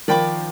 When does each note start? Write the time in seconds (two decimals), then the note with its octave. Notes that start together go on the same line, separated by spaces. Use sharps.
0.08 D#3 F3 D5 G5 B5 D6